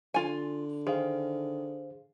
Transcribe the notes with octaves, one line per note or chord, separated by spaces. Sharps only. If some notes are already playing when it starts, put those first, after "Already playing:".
D3 F4 G#5
D#3 G#4 C5 F5